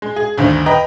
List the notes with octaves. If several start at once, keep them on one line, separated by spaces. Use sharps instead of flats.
G#3
G#4
G1 D2 D3 D#3 C5
B4 D#5 G5 A#5